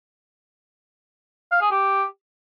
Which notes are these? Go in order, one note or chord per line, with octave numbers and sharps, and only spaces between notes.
F5
G#4
G4